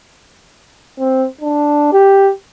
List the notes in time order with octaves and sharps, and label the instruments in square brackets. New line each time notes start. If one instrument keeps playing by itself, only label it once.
[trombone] C4
D4
G4